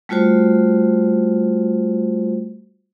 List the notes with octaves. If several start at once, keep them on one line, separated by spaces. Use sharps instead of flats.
G3 A3 F4 F#4 C5